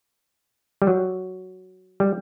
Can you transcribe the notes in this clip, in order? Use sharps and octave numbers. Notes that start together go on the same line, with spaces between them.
G3
F#3
G3